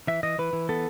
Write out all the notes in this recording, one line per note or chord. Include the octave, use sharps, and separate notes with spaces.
E3 E5
E3 D#5
E3 B4
E3
B3 A4